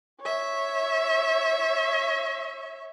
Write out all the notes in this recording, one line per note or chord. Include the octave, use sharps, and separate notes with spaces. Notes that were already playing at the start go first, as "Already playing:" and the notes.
C#5 E5